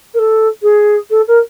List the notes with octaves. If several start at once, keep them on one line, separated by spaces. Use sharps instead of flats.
A#4
A4
G#4
A4
A#4